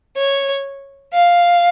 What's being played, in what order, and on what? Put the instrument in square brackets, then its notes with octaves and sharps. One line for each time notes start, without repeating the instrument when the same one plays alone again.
[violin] C#5
F5